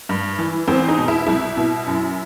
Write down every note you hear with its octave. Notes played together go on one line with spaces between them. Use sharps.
G2
E3
E2 C4
D#4
B2
E4
C2 E4
B2
F#2